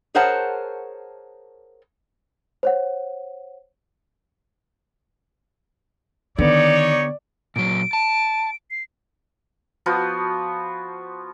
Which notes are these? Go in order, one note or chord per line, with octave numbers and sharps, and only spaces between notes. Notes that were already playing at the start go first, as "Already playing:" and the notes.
G#4 A#4 C5 C#5 F#5 A5
C5 C#5 F#5
D3 D#3 B3 D#4 G4 C#5 D5
A#2 F#3 D7
A5
C7
F3 B3 F#4 C5